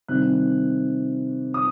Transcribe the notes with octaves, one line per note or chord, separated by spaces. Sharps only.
C3 D#3 G3 F#6
D#6